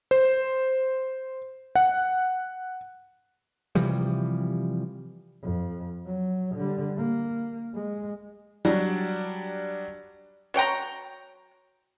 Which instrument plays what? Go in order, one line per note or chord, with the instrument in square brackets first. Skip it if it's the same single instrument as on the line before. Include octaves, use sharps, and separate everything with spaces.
[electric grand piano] C5
F#5
[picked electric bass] C3 E3 F3 G3
[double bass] F2
F#3
D3 G3
A#3
G#3
[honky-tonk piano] F#3 G3 D4
[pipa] F#3 C#5 G5 A#5